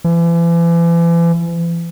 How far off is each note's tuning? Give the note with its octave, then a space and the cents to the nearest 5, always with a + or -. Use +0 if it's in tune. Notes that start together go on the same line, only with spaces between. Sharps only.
E3 +40